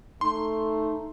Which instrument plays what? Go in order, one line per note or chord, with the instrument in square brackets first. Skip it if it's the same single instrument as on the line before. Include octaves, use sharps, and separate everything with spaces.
[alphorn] A3 [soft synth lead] D#4 [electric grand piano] C6